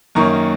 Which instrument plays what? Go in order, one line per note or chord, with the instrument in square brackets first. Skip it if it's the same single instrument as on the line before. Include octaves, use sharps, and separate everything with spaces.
[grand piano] F#2 D#3 A#3 C#4 A#5 C#6